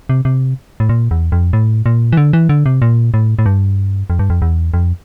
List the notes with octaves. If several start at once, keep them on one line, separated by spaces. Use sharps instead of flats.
C3
C3
A2
A#2
E2
F2
A2
A#2
E3
D3
E3
D3
C3
A#2
A2
A2
G2
F2
G2
F2
E2
F2